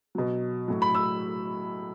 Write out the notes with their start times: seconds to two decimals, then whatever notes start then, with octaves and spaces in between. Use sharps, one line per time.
0.15 B2 F#3
0.68 A2 F#3
0.82 B5
0.95 E6